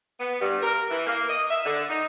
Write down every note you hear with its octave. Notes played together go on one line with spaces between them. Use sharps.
B3
G2
A#4
E3
A#3
D#5
E5
D3
D#4